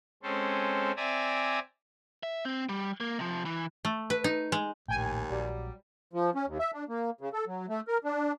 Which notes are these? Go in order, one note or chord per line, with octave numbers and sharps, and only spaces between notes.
G#3 C4 C#4 A4 C5
C4 D5 E5 G#5 A#5
E5
C4
G3
A#3
C3 F3
E3
A3
B4
D#4
G#3
A#1 D#2 A2 G5 G#5
A#1 F#3 G3
F3
C#4
D#2
E5
D4
A#3
C#3
A4
F#3
A3
A#4
D4